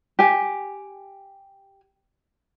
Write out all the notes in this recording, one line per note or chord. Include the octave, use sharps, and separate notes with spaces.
G4 G#5